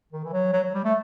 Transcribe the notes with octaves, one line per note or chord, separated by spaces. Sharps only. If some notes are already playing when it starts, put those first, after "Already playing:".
D#3
E3
F#3
F#3
F#3
G3
A3